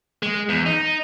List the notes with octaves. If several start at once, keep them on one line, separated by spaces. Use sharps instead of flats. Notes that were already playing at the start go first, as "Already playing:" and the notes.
G#3
E2
D#4